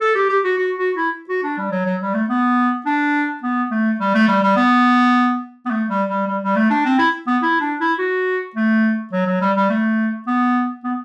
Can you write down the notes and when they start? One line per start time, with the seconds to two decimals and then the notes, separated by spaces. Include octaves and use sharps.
0.01 A4
0.15 G4
0.29 G4
0.44 F#4
0.58 F#4
0.78 F#4
0.96 E4
1.29 F#4
1.43 D4
1.58 G3
1.72 F#3
1.86 F#3
2.01 G3
2.14 A3
2.29 B3
2.86 D4
3.43 B3
3.71 A3
4.00 G3
4.15 A3
4.28 G3
4.43 G3
4.56 B3
5.66 B3
5.70 A3
5.90 G3
6.09 G3
6.27 G3
6.43 G3
6.56 A3
6.70 D4
6.86 C4
6.99 E4
7.27 B3
7.42 E4
7.61 D4
7.80 E4
7.99 F#4
8.56 A3
9.12 F#3
9.27 F#3
9.41 G3
9.56 G3
9.70 A3
10.27 B3
10.84 B3